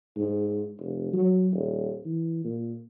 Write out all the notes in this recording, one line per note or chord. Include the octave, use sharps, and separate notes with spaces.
G#2
F1
F#3
D#1
E3
A#2